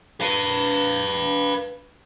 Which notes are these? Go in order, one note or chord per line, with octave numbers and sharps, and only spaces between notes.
B4 F5